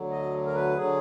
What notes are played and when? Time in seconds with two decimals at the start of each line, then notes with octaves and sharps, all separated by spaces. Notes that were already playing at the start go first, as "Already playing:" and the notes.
Already playing: D2 D3 F#3
0.11 D#5
0.46 A#4
0.55 B4
0.77 D3 F#3 G#4